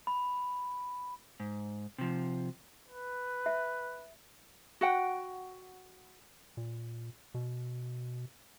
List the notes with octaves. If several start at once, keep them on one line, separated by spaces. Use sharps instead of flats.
B5
G#2
C3 F3
B4
E5
F#4 F#5 G5
A#2
B2